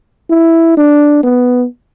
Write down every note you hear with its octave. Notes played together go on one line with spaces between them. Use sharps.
E4
D4
B3